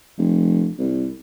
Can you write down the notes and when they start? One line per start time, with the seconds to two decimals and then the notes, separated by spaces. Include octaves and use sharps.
0.18 F1
0.79 C2